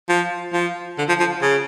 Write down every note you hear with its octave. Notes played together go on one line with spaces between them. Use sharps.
F3
F3
D3
F3
F3
C#3